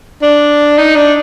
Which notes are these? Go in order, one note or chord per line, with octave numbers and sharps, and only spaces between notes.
D4
D#4
D4